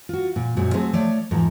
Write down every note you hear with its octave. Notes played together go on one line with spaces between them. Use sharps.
F4 F#4
A#2
F#2 A#2 G#3 C4 F#4
F#3 A3 C4 G#4 C5
F3 A3 C#5 D5
E2 G#2 F3 A4 A#5